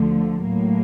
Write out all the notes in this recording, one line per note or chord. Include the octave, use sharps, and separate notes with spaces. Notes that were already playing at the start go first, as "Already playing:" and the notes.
Already playing: D2 D3 F3 A3
A2 F#3 A#3